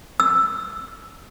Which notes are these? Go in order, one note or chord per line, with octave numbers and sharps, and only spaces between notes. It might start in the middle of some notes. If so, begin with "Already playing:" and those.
E6